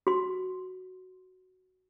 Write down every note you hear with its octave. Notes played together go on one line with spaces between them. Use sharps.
F#4 C6